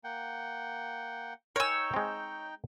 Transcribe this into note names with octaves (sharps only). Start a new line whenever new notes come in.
A#3 F#5 G5
D#4 A#4 C#5 G5 G#5 E6
G#3 C4